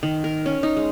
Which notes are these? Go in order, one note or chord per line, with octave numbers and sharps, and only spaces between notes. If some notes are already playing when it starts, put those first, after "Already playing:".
D#3
A#4
C#4
D#4
G#3